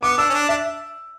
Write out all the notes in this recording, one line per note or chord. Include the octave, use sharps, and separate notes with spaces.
B3 D6
D4 E6
C#4
D4
D4 E5